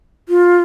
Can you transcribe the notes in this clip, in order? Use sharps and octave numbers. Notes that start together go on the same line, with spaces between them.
F4